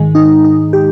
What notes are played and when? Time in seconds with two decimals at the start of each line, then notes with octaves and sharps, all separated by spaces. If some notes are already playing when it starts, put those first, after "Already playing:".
Already playing: G#2 D#3 G#3
0.15 D#4
0.44 D#4
0.73 G4